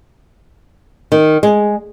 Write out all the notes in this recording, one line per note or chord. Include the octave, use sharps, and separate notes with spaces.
D#3
G#3